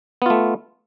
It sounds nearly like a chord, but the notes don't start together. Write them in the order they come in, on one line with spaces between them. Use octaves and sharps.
B3 F4 A3